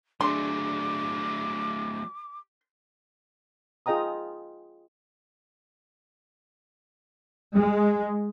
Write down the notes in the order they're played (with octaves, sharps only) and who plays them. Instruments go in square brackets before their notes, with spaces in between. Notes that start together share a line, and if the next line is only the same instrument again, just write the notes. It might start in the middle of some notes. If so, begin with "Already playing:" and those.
[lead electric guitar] F#3 A3 [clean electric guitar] D4 G#4 [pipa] C6 [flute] D6
[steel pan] F4 G#4 D#5 G5 A#5 D#6
[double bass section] G#3